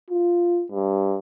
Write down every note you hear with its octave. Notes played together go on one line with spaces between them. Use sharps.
F4
G2